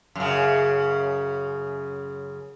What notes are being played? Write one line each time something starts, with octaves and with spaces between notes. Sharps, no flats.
F#2 C#3